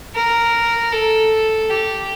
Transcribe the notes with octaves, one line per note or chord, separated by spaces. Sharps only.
A#4
A4
G4